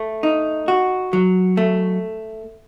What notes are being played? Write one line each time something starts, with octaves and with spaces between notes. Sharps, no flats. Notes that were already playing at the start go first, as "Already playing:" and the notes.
Already playing: A3
D#4
F#4
F#3
A3